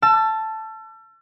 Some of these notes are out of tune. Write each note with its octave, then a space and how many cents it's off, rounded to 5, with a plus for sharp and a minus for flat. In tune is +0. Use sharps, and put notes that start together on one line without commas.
A5 +0 E6 +40